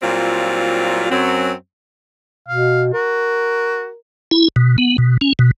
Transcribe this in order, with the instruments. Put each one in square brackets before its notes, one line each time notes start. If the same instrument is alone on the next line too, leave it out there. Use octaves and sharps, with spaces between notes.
[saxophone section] A#2 F#3 G3 C4 E4 F4
F#2 F#3 C4
[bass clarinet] B2 [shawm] F5
[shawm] F#4 [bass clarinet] A#4
[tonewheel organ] E4
B2
B3
B2
C#4
B2